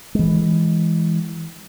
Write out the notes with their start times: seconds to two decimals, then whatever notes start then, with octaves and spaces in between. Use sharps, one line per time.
0.15 E3 G#3